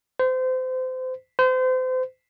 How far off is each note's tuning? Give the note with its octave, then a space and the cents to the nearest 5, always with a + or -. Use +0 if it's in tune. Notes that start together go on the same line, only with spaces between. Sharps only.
C5 -30
C5 -35